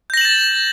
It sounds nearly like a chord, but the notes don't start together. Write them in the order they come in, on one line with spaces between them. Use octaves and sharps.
G6 A#6 F#7 E7 A6